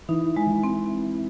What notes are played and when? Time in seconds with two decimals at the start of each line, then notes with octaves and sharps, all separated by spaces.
0.09 E3 D#4
0.36 G#3
0.51 E3
0.64 C4
0.91 C4